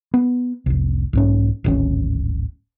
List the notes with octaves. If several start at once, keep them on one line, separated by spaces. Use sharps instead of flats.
B3
F1 C2
B1 G#2 C#4
D1 G#1 C#4